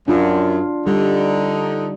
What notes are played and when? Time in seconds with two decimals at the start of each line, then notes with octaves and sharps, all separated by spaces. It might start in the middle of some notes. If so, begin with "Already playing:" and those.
0.08 F#2 D4 F4
0.87 D3 G3 D#4